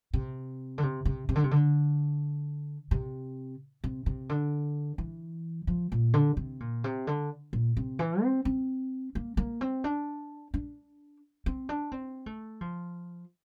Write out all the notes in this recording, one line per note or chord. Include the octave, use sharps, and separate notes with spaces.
C3
D3
C3
C3
C3
D3
C3
D3
C3
C3
C3
D3
E3
F3
A#2
D3
C3
A#2
C3
D3
A#2
C3
E3
C4
C4
A#3
A#3
C4
D4
D4
C4
D4
C4
A3
F3